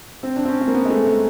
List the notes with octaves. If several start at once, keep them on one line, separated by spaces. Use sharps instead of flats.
C4
D4
C4
C#4
C4
A#3
B3
G#3
A3
G#3